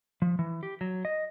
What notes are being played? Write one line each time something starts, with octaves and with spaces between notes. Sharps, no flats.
F3
E3
G4
F#3
D#5